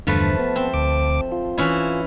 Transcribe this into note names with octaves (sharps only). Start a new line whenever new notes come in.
E2 G2 D3 F3 A3 B4
B3
C4
D2 D6
F4
E3 C#4 E4